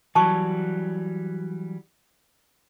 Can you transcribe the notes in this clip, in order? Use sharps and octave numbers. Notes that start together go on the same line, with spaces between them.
E3 F#3 G3 A5 C#6